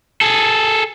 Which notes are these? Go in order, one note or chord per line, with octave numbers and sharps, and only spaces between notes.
G#4 A4